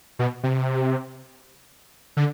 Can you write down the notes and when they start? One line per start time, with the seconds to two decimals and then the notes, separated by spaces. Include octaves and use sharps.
0.19 B2
0.43 C3
2.17 D3